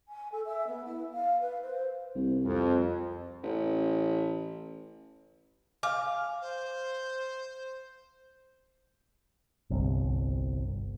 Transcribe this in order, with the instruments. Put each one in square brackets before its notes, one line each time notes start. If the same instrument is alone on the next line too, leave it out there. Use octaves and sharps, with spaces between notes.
[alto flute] G#5
A4
E5
B3
E4
F5
B4
C5
[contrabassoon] C2
[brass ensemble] F2
[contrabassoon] A1
[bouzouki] F5 [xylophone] G#5 D6 F6
[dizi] C5
[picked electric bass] G1 C2